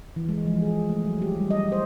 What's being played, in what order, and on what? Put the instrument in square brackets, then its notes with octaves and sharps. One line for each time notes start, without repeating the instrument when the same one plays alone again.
[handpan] E3
G#3
F3
G#4
A3
F#3
G4
G3
D#5
C5